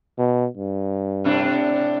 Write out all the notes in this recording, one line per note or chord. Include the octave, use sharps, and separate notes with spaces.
B2
G2
A2 C3 D4